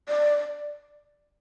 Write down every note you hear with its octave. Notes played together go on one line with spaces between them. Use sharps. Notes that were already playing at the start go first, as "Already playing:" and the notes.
D5